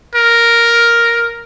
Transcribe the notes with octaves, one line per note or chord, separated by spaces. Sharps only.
A#4